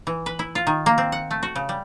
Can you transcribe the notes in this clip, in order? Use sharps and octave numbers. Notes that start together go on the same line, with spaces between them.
E3
B4
E4
F4
D#3
A#3
C4
F#5
A3
F#4
C#3
G3